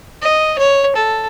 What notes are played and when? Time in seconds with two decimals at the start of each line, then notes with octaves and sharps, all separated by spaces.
0.22 D#5
0.59 C#5
0.96 A4